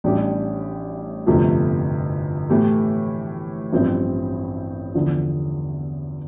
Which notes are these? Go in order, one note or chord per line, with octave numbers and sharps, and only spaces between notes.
A1 A2 G3 D4 G4
G1 F2 C3 F3 A3
A2 E3 A3 E4 G4
A1 G2 F3 C4 E4
E2 D3 F3